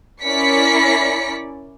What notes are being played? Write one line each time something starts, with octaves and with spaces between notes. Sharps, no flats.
C#4 E4 A#4 D5 B6 C#7